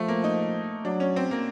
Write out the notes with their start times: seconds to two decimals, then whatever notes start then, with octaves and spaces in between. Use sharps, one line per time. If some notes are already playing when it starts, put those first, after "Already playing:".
Already playing: F3 A3
0.08 A#3
0.24 D#4
0.85 F#3 D4
1.00 C#4
1.16 C4
1.31 A#3